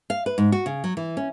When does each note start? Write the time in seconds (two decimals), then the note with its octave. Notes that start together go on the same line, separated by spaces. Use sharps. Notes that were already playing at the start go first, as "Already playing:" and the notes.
0.10 F5
0.26 B4
0.38 G#2
0.52 F#4
0.66 C#3
0.84 F#3
0.97 E3
1.17 C#4